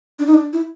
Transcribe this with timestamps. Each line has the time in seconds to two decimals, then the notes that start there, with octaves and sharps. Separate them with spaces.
0.19 D4
0.27 D#4
0.34 D4
0.53 E4